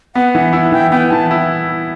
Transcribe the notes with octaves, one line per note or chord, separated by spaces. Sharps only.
B3 F#5
E3
E4
E3 G5
B3 G5
E3 A5
E4